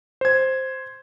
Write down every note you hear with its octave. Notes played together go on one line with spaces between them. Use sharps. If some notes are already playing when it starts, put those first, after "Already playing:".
C5 G#6